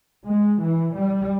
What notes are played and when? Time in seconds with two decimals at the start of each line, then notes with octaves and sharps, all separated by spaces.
0.26 G#3
0.61 E3
0.95 G3